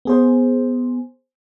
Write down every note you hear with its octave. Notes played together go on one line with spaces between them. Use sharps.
B3 G#4 C5